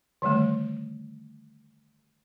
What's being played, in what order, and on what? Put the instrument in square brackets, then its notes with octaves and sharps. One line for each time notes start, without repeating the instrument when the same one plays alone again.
[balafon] D3 D#3 G3 A3